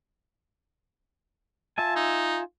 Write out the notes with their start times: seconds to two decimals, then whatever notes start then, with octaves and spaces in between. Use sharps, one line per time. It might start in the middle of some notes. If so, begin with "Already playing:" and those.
1.78 F4 E5 G#5 A5
1.96 D#4